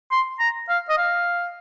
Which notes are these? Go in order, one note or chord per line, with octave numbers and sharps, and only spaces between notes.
C6
A#5
F5
D#5
F5